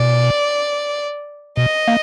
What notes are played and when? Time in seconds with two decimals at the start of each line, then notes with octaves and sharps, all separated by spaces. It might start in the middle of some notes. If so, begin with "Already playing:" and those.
Already playing: B2 D5
1.57 B2 D#5
1.88 A#3